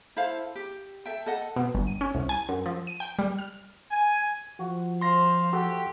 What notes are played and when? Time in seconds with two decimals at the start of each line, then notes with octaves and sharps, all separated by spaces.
0.17 E4 A4 C5 F5
0.55 G4
1.05 A4 E5 G5
1.26 A4 D#5 F#5
1.56 B2
1.75 G1
1.87 D#7
2.01 C#4
2.15 C2
2.29 G#5
2.49 F#2
2.66 F3
2.87 D#7
3.00 G5
3.19 G3
3.39 F6
3.91 G#5
4.59 F3 F#4
5.01 C5 F5 C6 A#6
5.53 F#4 G4 A4